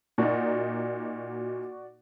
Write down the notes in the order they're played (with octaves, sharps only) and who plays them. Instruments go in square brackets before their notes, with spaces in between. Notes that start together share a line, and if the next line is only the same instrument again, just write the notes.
[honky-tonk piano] A#2 D#4 [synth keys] F#4 D5